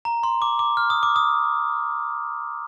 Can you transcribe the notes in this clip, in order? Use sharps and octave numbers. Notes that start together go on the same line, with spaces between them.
A#5
C6
D6
D6
F6
D#6
D6
D#6